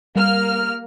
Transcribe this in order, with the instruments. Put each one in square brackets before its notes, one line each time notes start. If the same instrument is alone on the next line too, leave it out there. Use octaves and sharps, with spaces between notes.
[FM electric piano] G3 [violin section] A#3 F6